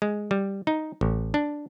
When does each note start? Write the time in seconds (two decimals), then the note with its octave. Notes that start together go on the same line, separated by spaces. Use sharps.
0.02 G#3
0.31 G3
0.67 D#4
1.01 A1
1.34 D4